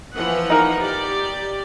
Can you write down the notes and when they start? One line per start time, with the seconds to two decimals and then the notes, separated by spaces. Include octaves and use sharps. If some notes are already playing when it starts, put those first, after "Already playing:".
0.15 E3 F3 F#5
0.50 D#4 A#4
0.80 G4 D5